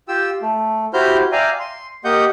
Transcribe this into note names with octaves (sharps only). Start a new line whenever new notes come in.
F4 G4 G5 E6
A3
E4 F#4 G4 C5 F6 G6
D5 E5 F5 G5 G#5 A#5
C6
A#3 G4 D#5 F#5 G6